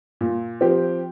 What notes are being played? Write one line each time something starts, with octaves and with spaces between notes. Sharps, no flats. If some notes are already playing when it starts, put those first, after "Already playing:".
A#2
F3 C4 G4